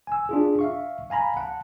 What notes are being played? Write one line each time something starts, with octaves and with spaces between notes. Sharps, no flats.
G#5 E6
D4 F4 G#4
E5 F5 C#6
F5 G#5 A#5 B5
F#5 A5